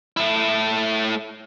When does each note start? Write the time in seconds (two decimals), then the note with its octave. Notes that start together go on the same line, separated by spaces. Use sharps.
0.17 A3 E4